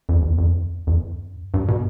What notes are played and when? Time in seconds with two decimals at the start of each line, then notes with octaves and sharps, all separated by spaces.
0.09 F2
0.22 E2
0.38 F2
0.87 F2
0.95 F#2
1.54 G2
1.68 B2